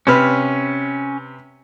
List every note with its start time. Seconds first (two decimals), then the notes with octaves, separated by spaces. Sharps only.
0.07 C3 C#4 B4 F6